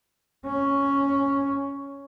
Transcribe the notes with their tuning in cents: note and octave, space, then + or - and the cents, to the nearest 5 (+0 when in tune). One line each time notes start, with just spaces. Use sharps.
C#4 +5